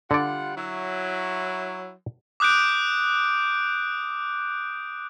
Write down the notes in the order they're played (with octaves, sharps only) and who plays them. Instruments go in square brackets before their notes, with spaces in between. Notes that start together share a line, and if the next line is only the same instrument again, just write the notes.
[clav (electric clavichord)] D3 D5 [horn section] G3 F4 F#5
[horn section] F#3 E4
[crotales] D6 D#6 F#6 G6 D7